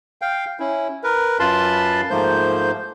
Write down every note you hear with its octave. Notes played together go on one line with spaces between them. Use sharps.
F5 G5
C#4 E4
A#4 B4
F#2 F4 B4 A5 B5 C6
G#2 F3 A3 A#3 C5 G6